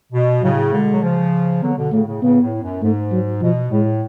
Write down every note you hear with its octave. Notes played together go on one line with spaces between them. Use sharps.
B2
A2 C#3 F#3
B2 D3 G#3
F#3
C#3 F3
D3 F#3 B3
B2 D3
A2 C#3 A3
A2 C#3
A2 C#3 B3
A2
F#2
G#2 A3
F#3
B2 F3
A2 G#3